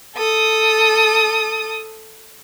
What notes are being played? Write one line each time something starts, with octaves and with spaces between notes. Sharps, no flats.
A4 D#6